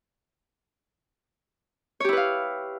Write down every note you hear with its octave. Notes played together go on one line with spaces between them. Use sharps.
E4 G4 B4 C#5 F5